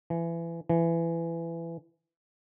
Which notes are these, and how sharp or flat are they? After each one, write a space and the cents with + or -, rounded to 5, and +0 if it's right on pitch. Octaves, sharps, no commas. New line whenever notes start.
E3 +25
E3 +20